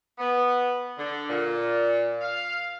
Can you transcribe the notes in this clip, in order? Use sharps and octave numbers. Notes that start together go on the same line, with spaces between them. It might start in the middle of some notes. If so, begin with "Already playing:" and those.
B3
D3
A#2
F5